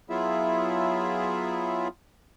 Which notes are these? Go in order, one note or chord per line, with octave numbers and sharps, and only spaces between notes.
F#3 B3 E4 F4 G#4 E5